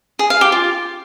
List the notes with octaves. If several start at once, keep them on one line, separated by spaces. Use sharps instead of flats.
G#4
F5
G4
F4